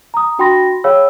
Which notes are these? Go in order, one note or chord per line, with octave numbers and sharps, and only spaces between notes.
A#5 D#6
D4 F#4 G5 B5 C6 A#6
G#4 C#5 F5 G5 B5 E6